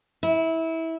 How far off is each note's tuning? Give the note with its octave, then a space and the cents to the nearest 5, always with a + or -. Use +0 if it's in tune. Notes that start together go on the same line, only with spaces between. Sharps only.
E4 -20